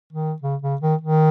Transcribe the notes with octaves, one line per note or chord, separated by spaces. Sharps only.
D#3
C#3
C#3
D#3
D#3